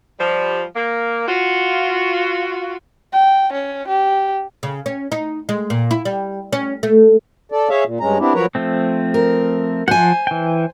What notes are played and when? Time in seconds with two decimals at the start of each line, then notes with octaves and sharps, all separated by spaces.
0.19 F3 G3
0.75 A#3
1.28 F4 F#4
3.13 G5
3.53 C#4
3.88 G4
4.63 C#3
4.86 C#4
5.12 D#4
5.49 G#3
5.70 A#2
5.91 E4
6.05 G3
6.53 C#4
6.83 A3
7.52 A4 D5
7.69 G#4 C#5 E5 F5
7.85 A#2
8.00 G2 G#3 C#4 A#5
8.19 B3 C4 D4 E4 G4
8.34 F3 F#3 A#4 B4 C#5 A#5
8.55 F3 A3 C4
9.14 A#4
9.88 F3 C5 F#5 G#5
10.27 E3 G5